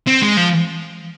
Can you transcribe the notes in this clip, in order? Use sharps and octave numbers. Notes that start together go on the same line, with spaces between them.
C4
G#3
F3